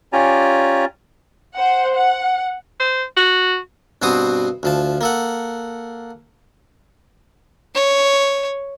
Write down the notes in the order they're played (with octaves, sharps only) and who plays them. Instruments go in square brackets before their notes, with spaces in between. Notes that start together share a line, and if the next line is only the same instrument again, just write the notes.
[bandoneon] C#4 F4 G4 D5 G#5 A#5
[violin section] C5 F#5
F#5
[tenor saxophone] C5
F#4
[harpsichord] G2 B2 C4 F#4 C5 D#6
D2 F3 A5
A#3 A4 F#5
[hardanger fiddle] C#5